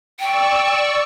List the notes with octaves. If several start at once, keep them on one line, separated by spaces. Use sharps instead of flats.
D5 G5 C#6 E6